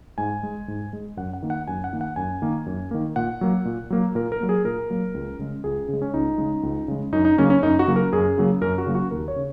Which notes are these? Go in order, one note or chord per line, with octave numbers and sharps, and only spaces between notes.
G#2 G#5
G#3
G#2
G#3
F#2 F#5
F#5
D#3 A#3
F#5
F#2 G#5
F#5
D#3 A#3
F#5
F#2 G#5
D#3 A#3
F#2
D#3 A#3
A#2 F#5
F#3 A#3
A#2
F#3 A#3
A#2 A#4
A#4
F#3 A#3
G#4
A#2 A#4
F#3 A#3
C#2
C#3 G#3
C#2 G#4
C#3 G#3
C#4
C#2 D#4
C#3 G#3
C#2
C#3 G#3
F#2 D#4
D#4
C#3 F#3 A#3 C#4
C#4
F#2 D#4
F#4
C#3 F#3 A#3
A#4
F#2 G#4
C#3 F#3 A#3
F#2 A#4
F#4
C#3 F#3 A#3
F#4
D#2 A#4
C#5
C#3